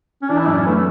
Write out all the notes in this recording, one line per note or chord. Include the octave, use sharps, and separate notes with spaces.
C#4
E3 D4
E4
F#2 D4
C#4
A3 B3